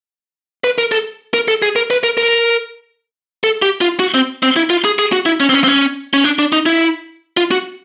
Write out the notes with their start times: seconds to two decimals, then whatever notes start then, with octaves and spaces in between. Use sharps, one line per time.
0.64 B4
0.78 A#4
0.92 A4
1.34 A#4
1.48 A4
1.62 G#4
1.76 A#4
1.90 B4
2.03 A#4
2.17 A#4
3.44 A4
3.62 G4
3.81 F4
4.00 F#4
4.14 C4
4.43 C4
4.56 E4
4.70 F4
4.85 G#4
4.99 G#4
5.13 F#4
5.26 E4
5.40 C#4
5.49 C4
5.54 C#4
5.64 C4
5.68 C#4
6.13 C#4
6.24 D4
6.39 D4
6.52 D#4
6.66 E4
7.37 F4
7.51 F#4